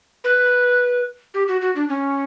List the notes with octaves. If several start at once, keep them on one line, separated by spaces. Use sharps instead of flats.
B4
G4
F#4
F#4
D4
C#4